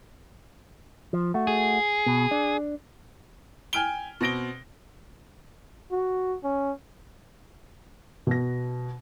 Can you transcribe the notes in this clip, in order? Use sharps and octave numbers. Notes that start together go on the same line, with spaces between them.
F3
A3 F#4
G#4
B2
D4 D5
G5 G#5 F6 D7 G7
B2 C4 A#6 D7 G7
F#4
C#4
B2 A#6